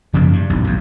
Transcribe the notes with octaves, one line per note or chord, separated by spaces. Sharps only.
F#2 C#3 F3 A#3
G2
D#1 B1
B1 F2